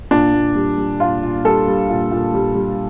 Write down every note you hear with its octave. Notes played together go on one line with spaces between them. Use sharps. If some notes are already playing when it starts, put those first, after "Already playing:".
A#2 D4
A#2
G3
G3
A#2 F4
A#2
G3 A4
G3
A#2
A#2
G3
G3